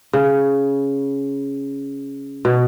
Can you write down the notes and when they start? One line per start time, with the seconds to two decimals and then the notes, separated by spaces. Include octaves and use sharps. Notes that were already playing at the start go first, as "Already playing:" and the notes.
0.13 C#3
2.45 B2